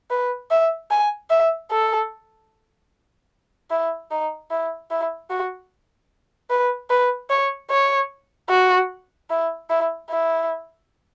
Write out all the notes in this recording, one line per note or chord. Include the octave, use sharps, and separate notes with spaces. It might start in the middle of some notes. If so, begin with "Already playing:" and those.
B4
E5
G#5
E5
A4
E4
D#4
E4
E4
F#4
B4
B4
C#5
C#5
F#4
E4
E4
E4